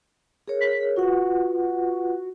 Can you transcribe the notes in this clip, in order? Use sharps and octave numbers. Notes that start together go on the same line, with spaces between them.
G#4 A#4 C#5
B6
F4 F#4 B4 F#5